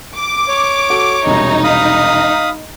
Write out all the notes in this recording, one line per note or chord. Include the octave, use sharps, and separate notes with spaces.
D6
C#5
F#4 A4
E1 C2 B2 D#4
F5 B5 D#6